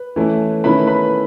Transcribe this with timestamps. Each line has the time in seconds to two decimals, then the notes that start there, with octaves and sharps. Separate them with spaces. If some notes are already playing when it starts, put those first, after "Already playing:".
Already playing: B4
0.16 E3 A3 C#4 E4
0.64 D#3 A3 C#4 E4 B4 B5
0.87 B4 B5